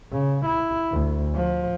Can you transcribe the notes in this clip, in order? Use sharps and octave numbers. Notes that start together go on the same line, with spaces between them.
C#3
E4
D2
F3